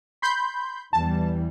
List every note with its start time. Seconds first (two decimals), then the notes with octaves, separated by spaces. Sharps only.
0.22 B5 C6 G6
0.93 E2 E3 G3 A5